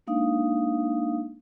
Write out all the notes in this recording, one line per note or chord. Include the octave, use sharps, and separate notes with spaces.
G#3 A#3 D4 D#4 F5 D#6